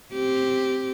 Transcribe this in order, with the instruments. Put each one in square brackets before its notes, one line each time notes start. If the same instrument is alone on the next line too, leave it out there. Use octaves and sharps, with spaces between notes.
[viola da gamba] C4 G4